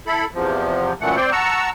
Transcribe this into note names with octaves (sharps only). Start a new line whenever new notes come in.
E4 A4 B5
E2 C3 F3
F#2 A#2 E3 A3 F#5
C4 C5 D5 G5
F#5 A5 A#5 C#6 E6